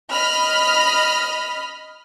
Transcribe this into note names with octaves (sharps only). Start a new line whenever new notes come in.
D#5 B5 F6